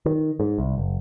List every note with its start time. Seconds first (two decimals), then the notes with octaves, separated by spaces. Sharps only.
0.06 D#3
0.40 G#2
0.58 C2
0.78 F#1